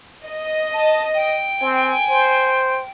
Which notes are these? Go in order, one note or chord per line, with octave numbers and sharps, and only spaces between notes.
D#5
A5
G5
C4 G#5
C5